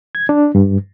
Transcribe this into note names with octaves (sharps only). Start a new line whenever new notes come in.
G#6
D4
G2